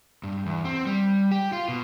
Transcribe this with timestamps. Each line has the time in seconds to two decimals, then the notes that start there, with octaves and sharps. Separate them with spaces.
0.23 G2
0.46 E2
0.65 C4
0.86 G3
1.31 G4
1.53 F4
1.68 B2